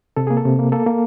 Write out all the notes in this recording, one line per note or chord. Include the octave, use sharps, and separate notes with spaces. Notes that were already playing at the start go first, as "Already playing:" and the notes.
C3 A4
A#3 G#4
A4
C3
A#3
A#3 A4
A#3